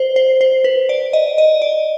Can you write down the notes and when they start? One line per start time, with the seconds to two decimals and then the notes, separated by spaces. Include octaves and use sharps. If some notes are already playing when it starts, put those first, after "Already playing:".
Already playing: C5
0.16 C5
0.41 C5
0.64 B4
0.89 D5
1.13 D#5
1.38 D#5
1.62 D5